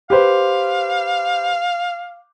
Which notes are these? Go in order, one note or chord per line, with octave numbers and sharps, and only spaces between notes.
G4 B4 C5 F5